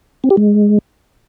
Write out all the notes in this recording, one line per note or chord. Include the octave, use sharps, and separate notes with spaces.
C4
G4
G#3